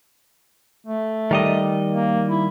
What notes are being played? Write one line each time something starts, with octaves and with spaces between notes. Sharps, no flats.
A3
D#3 G3 D#5
A#3
E4